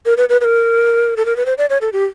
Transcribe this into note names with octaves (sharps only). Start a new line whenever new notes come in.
A#4
B4
B4
B4
A#4
A4
A#4
B4
C5
D5
C#5
A4
G4